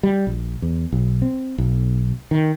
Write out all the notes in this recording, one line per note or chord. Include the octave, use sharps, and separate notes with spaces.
G3
A#1
E2
B1
C4
B1
D#3